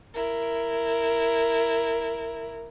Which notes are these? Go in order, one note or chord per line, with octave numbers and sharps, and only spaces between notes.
E4 A#4